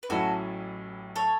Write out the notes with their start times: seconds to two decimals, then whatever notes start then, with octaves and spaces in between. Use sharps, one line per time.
0.03 B4
0.09 A1 A2 F#3 C#4 E4 F#4 A4
1.16 A4 C#5